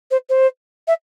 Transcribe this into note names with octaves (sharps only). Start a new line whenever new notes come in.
C5
C5
E5